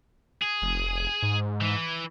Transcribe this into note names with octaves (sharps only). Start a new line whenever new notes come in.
G#4
F1
G#2
E3